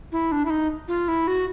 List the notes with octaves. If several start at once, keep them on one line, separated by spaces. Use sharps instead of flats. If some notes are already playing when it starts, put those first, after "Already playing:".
E4
D4
E4
D#4
F4
E4
F#4